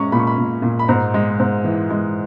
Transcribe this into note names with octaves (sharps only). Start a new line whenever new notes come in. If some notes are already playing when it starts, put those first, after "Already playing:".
Already playing: A#2 G#3 C#4 A#5 C#6
A#2 B5
C#6
B5
A#2
A#2
B5
G#2 A#5
G#3
G#2
E3
G#3